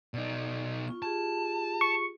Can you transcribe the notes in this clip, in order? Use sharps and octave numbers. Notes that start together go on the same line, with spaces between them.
B2 D#4 D5
F4 C#6
F4 G4 G#4 A5
C#6